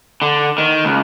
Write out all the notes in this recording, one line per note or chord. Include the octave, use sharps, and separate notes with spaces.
D3
D#3
C#2